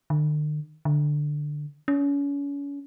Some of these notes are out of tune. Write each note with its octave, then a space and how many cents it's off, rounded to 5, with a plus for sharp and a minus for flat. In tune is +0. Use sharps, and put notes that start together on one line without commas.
D3 +45
D3 +10
C#4 +35